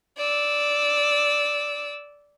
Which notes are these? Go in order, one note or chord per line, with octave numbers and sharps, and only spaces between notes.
D5 E6